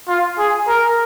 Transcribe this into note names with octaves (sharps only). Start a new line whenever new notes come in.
F4
G#4
A#4